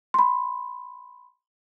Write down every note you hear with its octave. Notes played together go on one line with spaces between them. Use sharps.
B5 C6